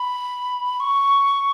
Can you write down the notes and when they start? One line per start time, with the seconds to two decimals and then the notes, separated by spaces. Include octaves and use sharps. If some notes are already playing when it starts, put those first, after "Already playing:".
Already playing: B5
0.80 C#6